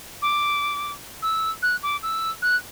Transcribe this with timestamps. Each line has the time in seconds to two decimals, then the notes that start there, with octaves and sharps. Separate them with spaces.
0.22 D6
1.22 E6
1.62 F#6
1.83 D6
2.02 E6
2.42 F#6